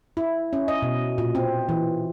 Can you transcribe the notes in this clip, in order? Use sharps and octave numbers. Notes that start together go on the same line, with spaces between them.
E4
C#4
D#5
B2
A#2
C4
E3